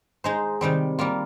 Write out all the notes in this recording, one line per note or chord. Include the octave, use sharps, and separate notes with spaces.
G#3 D#4 G#4 C5
C3 D#3 G3 C4
G3 A#3 F4